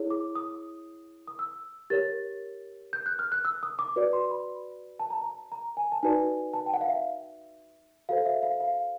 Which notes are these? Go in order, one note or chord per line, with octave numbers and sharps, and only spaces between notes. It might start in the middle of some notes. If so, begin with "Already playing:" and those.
Already playing: E4 G#4 C#5
D6
D#6
D#6
E6
G4 A#4 C#5 A6
G6
F#6
F6
F#6
E6
D#6
D6
F#4 B4 D5
C6
B5
A5
A#5
A5
A#5
G#5
A5
D#4 F#4 B4 D5 G#5
A5
G5
F#5
F5
E5
F#4 A4 C5 F5
E5
F5
F5